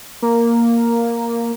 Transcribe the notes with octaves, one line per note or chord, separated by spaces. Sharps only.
A#3